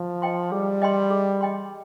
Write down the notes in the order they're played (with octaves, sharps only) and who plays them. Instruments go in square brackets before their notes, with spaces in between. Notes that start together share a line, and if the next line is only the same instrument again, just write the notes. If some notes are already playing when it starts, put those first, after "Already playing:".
Already playing: [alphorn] F3
[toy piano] D#5 G5 C6
[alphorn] G3 [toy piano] G#4
[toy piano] D#5 G5 C6
G#4
D#5 G5 C6